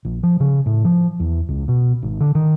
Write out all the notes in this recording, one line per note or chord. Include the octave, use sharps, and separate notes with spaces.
A#1
F3
C#3
A2
F3
E2
C#2
B2
G#1
D3
D#3